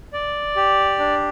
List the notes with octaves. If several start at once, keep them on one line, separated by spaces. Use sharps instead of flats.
D5
G4
D4